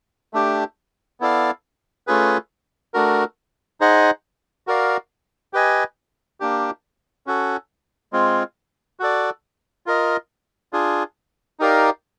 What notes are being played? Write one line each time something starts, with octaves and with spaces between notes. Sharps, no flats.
A3 D4 G4
B3 E4 A4 D5 F5
A3 C#4 F4 G#4 B4
A3 D4 F#4 A#4
D#4 G#4 C5 D#5 F#5
F#4 A#4 D5 F5
G4 B4 D#5 G#5
A#3 D4 G4
C#4 F#4 A4
G#3 C4 F4
F#4 A4 D5
F4 A#4 D#5
D4 F4 G#4
D#4 G4 A#4 D5 F5